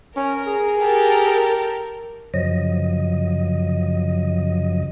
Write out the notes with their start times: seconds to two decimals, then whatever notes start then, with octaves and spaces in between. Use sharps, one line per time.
0.17 C#4 A#4
0.47 G#4
0.79 G4 A4 A#4
2.34 F#2 C#3 F3 F#3 D#5